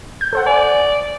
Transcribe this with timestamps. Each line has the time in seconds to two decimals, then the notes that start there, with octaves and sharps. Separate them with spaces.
0.21 G6
0.33 A4 C5 F#5
0.46 D5 G#5